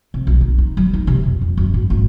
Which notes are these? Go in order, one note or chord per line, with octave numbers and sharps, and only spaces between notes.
C3
B1
D#4
D#4
F#3
D#4
C3
F2
F2
F#2
G#2
G#1